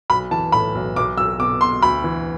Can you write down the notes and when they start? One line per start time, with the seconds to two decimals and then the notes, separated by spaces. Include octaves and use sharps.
0.10 B1 B5
0.31 E3 A5
0.52 A2 B5
0.75 B1
0.96 B1 D6
1.17 B1 E6
1.39 B2 D6
1.61 B2 C6
1.82 D2 B5
2.04 E3